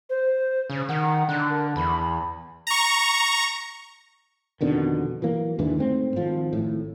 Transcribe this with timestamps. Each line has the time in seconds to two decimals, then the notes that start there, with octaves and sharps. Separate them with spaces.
0.09 C5
0.70 C#3
0.89 D#3 F#5
1.29 D3 F#6
1.50 A#4
1.76 E2 B5
2.67 A#5 C#6
4.61 F2 B2 D3 D#3
5.22 E3 F#3 A#3
5.59 D#2 G#2 D3 E3
5.78 G#2 A3 C4
6.16 G#1 F3
6.53 G#1 A2